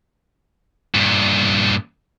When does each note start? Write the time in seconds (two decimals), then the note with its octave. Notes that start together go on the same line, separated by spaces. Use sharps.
0.95 G2 A#2